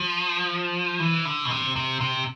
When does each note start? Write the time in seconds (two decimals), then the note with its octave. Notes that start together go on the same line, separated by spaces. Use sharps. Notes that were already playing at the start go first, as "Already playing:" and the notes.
Already playing: F3
1.00 E3
1.25 D3
1.45 B2
1.50 C3
1.76 C3
2.01 C3